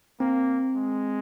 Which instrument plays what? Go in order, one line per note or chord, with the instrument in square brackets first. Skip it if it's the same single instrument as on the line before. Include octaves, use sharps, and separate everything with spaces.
[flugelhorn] A#3 [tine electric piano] C4
[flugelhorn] G#3